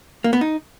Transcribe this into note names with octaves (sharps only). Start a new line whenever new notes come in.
A#3
B3
D#4